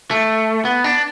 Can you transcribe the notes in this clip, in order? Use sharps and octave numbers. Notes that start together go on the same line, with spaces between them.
A3
B3
D4